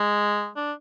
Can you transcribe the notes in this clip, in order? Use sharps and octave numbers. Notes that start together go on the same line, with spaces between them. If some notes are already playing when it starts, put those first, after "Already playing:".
Already playing: G#3
D4